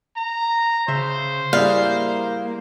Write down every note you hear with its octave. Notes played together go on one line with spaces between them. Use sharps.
A#5
C#3 C5 E5
G3 A#3 E4 G#4 F5